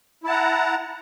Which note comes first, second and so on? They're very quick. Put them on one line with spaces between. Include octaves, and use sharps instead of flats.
E4 A5 F#5 A#5